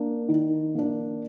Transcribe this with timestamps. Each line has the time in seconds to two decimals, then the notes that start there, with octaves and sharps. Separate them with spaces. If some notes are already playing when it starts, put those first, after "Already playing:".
Already playing: A#3 D4
0.28 D#3
0.75 A#3 D4